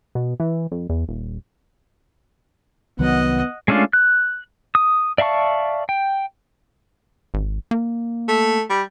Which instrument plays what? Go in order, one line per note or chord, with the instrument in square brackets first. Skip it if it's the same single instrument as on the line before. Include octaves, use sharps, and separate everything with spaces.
[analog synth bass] B2
E3
F2
E2
D#1
[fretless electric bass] C2 D#3 F#3 [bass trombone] B3 [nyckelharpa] D#5 F#5
[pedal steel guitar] G#3 A3 C#4 D4 F4
F#6
D#6
D5 E5 F5 A5 C#6
G5
[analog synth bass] G#1
A#3
[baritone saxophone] A3
G3